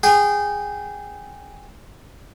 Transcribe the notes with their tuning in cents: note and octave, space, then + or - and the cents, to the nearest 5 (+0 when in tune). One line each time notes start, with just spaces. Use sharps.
G#4 -15 G5 -25